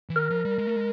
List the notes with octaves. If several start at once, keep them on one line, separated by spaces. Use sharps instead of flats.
E3
D#3 A#4
F3
G3
G#3
A3
G#3